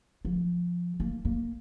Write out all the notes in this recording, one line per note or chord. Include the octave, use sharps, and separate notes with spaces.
F3
A#3
A#3